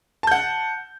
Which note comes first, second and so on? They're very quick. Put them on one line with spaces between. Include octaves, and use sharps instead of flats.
A5 G6 F#5